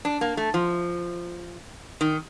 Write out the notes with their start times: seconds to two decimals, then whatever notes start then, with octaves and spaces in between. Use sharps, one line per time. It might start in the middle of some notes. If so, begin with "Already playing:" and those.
0.05 D4
0.21 A#3
0.37 A3
0.54 F3
2.01 D#3